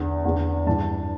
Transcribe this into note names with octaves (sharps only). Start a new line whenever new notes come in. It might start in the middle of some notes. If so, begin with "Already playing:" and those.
Already playing: E2 D3
E2 D3
G2 E3 A5